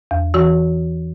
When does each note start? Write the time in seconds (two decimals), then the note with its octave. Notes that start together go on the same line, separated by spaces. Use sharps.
0.11 E2
0.34 E3 F#4